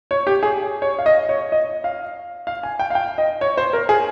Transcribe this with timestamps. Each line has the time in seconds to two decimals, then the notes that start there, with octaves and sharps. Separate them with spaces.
0.11 C#5
0.27 G4
0.43 G#4
0.82 C#5
0.99 F5
1.06 D#5
1.29 C#5
1.52 D#5
1.84 F5
2.47 F5
2.63 G#5
2.79 G5
2.90 F5
2.95 G5
3.18 D#5
3.41 C#5
3.57 C5
3.73 A#4
3.89 G#4